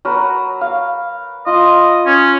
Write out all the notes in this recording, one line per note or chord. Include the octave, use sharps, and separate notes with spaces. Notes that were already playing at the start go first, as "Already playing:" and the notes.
F#3 A#4 B4
F5
F4 D#5
C#4